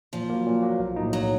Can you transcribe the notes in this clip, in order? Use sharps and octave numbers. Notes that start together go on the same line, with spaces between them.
A#2 F3
F#3 A#3
A#2
F#3 A#3
B1
A2 F#3 A#3 D#4
B1 F#3